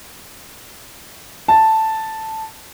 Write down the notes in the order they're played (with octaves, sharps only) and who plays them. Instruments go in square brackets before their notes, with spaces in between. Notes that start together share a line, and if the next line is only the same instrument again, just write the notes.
[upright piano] A5